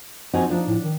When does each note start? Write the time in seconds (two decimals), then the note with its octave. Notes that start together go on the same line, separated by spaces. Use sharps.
0.34 F3 C4 D#4 F#4 G#5
0.50 F3 D4 D#4
0.67 A2
0.82 D#3